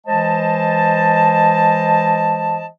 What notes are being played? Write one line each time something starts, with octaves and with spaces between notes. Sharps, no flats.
E3 G#3 C5 D#5 A5